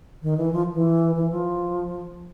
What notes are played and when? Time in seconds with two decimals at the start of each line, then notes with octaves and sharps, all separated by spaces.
0.23 D#3
0.38 E3
0.53 F3
0.74 E3
1.16 E3
1.31 F3